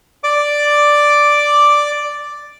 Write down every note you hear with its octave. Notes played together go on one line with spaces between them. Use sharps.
D5 D6